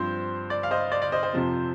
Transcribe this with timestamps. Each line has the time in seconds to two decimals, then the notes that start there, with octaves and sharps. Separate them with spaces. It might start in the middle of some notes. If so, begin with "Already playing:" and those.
Already playing: G2 F3 C4 C5
0.50 D5
0.63 F5
0.71 C5 D#5
0.92 D5
1.02 D5
1.12 C5 D#5
1.23 C5
1.33 F2 C3 F3 C4